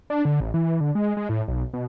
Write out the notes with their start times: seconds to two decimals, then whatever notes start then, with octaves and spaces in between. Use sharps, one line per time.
0.10 D4
0.25 D3
0.40 A1
0.54 E3
0.81 D3
0.95 G#3
1.17 G#3
1.29 A2
1.48 B1
1.74 B2